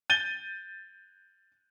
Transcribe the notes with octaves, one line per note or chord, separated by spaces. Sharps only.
G6 A6 D#7 G7